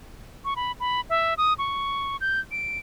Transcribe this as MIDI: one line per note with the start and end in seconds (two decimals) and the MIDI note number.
0.45 0.54 85
0.56 0.72 83
0.80 1.01 83
1.10 1.34 76
1.38 1.54 87
1.59 2.17 85
2.21 2.40 91
2.52 2.78 98